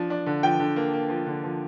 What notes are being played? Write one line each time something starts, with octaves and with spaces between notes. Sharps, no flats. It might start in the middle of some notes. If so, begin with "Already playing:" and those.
Already playing: F3 D4
D4
D3
F3 G5
D3
A#3
A#3
F3
D3
F3